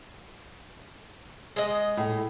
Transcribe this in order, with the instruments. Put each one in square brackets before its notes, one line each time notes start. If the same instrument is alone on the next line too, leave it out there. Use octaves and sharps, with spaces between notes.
[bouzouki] G#3 D#5
[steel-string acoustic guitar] A2